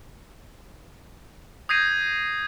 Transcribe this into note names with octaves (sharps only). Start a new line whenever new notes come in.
D#6 G6 G#6 A#6 C7 D#7